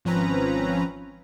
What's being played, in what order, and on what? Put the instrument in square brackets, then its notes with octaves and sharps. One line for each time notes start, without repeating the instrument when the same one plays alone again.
[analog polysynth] G#1 F3 C4 C#4 B4 A#5